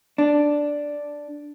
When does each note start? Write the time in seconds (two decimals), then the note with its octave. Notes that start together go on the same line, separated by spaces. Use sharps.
0.18 D4